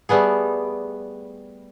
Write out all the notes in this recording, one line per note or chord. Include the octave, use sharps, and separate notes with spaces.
G3 A3 B3 G#4